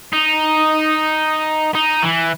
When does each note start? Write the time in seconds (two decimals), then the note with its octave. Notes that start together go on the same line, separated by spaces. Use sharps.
0.13 D#4
1.74 D#4
2.02 E3